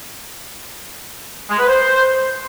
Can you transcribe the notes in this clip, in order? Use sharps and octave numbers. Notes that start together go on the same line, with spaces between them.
G#3
B4
C5